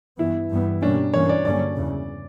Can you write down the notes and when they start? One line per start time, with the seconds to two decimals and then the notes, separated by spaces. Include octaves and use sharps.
0.18 G2 E3 B3 E4
0.50 G2 E3 G3 B3
0.82 B2 G3 A#3 C#4 D4
1.13 G2 E3 A#3 C#4 C#5
1.29 D5
1.45 G2 D3 F#3 A#3 C#4 D5
1.76 E2 C#3 E3